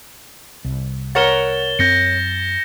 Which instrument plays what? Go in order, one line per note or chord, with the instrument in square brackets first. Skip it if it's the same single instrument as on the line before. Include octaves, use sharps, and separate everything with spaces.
[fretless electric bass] C2
[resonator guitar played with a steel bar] A#4 C#5 F#5 [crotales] A6 E7 G7
[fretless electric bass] F#2 C4 [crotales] G6 A#6 C#7